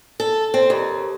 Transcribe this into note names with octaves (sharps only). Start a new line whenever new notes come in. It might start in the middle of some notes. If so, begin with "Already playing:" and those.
A4
C4
D#2